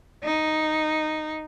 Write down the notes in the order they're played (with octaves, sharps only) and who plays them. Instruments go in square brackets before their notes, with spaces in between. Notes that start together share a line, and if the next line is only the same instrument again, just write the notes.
[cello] D#4